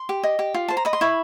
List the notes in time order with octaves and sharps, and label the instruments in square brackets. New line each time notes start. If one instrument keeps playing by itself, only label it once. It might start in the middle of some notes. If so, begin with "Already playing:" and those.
Already playing: [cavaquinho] C6
G4
D#5
G4
F4
C5 A5
A#5
D#5 B5
C6
E4 B5 C#6